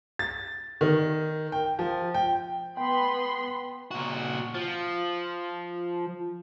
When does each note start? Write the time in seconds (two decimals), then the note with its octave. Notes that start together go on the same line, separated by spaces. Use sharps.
0.19 A6
0.81 D#3
1.52 G5
1.79 F3
2.14 G5
2.77 B3 G5 B5 C6
3.91 A#2 F#4
4.55 F3